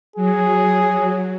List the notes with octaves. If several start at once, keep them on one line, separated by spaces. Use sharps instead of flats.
F#3 G#4